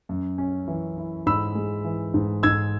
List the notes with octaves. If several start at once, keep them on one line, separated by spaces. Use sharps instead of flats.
F#2
C#4
E3
E4
G#2 B5 E6
G#3
E3
G#2
G#2 E6 G#6